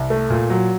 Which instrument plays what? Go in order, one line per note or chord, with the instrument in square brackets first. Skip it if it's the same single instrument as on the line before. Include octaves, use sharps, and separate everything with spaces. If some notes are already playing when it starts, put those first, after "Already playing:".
Already playing: [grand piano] C2
A3
A#2
F#3